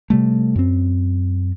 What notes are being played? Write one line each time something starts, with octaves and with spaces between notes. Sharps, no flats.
C3 G3 A3
F#2 C4